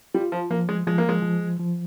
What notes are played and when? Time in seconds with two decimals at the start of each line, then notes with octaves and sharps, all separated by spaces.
0.14 G3 F4
0.32 F3
0.50 F3 A#3
0.69 G#3
0.87 F3 G#3
0.98 A#3
1.09 G#3
1.22 F3
1.60 F3